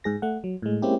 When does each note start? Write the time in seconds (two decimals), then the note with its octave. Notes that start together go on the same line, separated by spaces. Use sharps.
0.04 G#2 G#4 A#6
0.22 A3 F#5
0.44 F#3
0.62 A2 G#3
0.82 G#3 A#3 C4 C#4 E4 G4